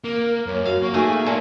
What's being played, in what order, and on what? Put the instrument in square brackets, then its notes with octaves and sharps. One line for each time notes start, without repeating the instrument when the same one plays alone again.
[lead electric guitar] A#3 [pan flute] A#4
[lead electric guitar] F#2 [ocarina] A#4 [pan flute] C#5
[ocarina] F#4 [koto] F5
[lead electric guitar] A#3 [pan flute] C#6
[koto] A3 G#4 [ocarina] D#4 [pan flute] G#5
[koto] A#2 [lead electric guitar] G#4 A#4 [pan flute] A5